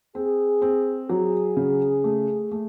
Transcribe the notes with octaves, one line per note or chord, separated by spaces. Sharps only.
C4 G#4
C4
F#3 G#4
C#3
A3
A3